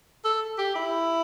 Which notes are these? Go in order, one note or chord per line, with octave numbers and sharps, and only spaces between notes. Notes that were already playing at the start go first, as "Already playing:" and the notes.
A4
G4
E4